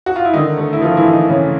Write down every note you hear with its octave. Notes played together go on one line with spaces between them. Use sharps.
F#4
F4
E4
D3 D#3 D#4
A3
E4
F3 A3 F4
E3 E4
A3
D#3 D#4
C#3 A3 C#4